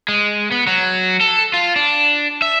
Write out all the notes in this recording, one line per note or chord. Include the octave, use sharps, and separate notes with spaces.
G#3
B3
F#3
A4
F4
D4
E5